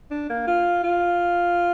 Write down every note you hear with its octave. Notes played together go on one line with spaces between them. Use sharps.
D4
A#3
F4
F4